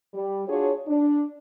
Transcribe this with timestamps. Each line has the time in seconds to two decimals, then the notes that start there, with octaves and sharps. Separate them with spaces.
0.14 G3
0.48 D4 F4 F#4 G#4 C#5
0.87 D4